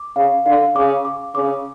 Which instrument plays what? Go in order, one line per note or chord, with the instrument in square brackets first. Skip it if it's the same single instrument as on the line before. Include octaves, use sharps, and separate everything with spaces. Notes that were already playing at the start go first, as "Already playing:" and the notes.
Already playing: [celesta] D6
[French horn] C#3 [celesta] F5
[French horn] D3 [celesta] F5
[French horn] C#3 [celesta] D6
[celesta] D6
[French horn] C#3 [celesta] D6